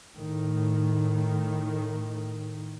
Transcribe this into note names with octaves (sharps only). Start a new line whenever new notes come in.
A2 D#3